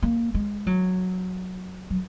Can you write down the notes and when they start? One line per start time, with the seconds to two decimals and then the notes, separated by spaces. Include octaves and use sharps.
0.03 A#3
0.34 G#3
0.67 F#3
1.90 F#3